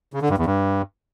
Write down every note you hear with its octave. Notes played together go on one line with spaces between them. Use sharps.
C#3
D3
G2
E2
G2